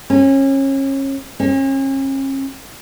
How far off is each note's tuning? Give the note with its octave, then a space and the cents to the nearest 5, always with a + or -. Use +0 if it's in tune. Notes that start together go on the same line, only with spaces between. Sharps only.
C#4 -30
C#4 -40